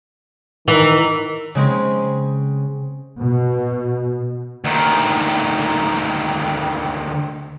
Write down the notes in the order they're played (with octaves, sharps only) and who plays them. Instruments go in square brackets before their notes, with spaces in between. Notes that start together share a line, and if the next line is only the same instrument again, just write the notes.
[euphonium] D#3 [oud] E3
[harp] C#3 G#3 C4 C#4
[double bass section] B2
[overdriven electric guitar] D2 D#3